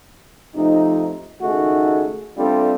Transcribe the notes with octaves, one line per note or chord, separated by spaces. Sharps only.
C3 F3 A3 D#4
C#2 D#3 A3 D#4 F#4 G#4
G3 A3 C4 D4 F4 A4